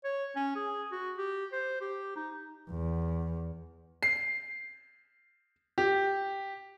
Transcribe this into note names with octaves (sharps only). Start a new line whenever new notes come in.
C#5
C#4
G#4
F#4
G4
C5
G4
D#4
E2
C7
G4